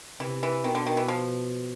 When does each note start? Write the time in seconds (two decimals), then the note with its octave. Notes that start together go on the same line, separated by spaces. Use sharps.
0.20 C3 E3
0.43 E3
0.64 B2 D#3
0.75 D3
0.87 D#3
0.97 E3
1.08 F3